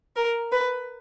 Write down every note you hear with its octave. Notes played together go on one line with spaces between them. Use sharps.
A#4
B4